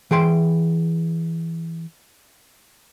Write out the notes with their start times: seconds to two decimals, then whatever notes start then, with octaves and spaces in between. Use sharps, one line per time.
0.11 E3 G#4 G5 C6